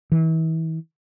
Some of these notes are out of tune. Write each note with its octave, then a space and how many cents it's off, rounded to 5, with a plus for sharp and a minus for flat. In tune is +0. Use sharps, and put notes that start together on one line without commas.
E3 -35